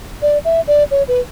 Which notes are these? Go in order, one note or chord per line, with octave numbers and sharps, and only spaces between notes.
D5
E5
D5
C#5
B4